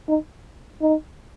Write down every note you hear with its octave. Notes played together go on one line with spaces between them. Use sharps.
D#4
D#4